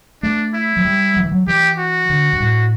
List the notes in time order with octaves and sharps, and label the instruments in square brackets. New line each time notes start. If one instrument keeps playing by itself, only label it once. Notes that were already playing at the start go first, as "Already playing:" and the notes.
[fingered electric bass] A3 [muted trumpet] D4
[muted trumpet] E4
[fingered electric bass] F#3
G3
F#3
E3
F#3
[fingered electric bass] E3 [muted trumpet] G4
[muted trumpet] F#4
[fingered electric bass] D3
G2
A2